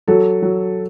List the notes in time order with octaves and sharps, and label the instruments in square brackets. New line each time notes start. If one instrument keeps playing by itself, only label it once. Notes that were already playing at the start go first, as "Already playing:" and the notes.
[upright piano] F#3 [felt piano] A4
[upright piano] F#3